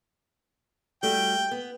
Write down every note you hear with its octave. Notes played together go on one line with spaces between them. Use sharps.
G3 A3 F#4 G5
B3